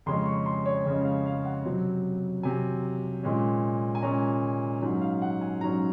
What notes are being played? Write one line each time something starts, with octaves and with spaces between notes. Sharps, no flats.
F2 C#3 G#3 C#4 C6
C#6
C6
C#5
F2 C#3 G#3 C#4
F5
F5
F#5
C3 F#3 C4
C3 F#3 C4 G#5
A#2 G#3 C#4
G#5
A#2 G#3 C#4 A#5
G#2 F#3 C#4 D#5
F5
F#5
G#5
G#2 F#3 C#4 A#5